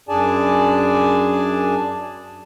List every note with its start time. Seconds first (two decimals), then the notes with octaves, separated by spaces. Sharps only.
0.09 F#2 D4 G#4 D5 G#5 A5